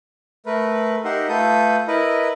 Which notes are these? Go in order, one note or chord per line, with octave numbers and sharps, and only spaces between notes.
A3 A#4 B4
D#4 G4 A#4 E5 F#5 C6
A3 F4 A4 B4 D#6 G6
E4 A#4 B4 D#5